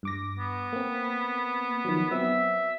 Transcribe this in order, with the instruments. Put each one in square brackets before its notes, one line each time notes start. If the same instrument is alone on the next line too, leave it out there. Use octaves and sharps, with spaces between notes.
[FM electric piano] G2 D6 A#6
[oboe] B3
[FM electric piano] A#3 C4
D#3 F3 F#3
[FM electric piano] F#3 B3 C4 [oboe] E5